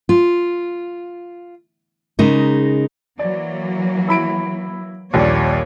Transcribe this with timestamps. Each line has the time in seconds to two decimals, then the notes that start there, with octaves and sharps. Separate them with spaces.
0.09 F4
2.19 C#3 G#3 D#4 A#4
3.19 E3 F#3 A#3 D5
4.08 E4 B5 D7
5.13 A#1 D#2 G3 A#3 C#5 D5